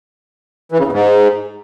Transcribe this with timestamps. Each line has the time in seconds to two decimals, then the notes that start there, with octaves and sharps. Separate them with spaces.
0.72 E3
0.79 C#3
0.85 E2
0.92 G#2